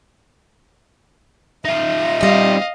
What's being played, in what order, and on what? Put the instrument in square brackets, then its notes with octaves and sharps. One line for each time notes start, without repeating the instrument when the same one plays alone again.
[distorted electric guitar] D#4 F4 [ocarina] E5
[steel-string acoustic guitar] G3 C4 [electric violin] D#5 F5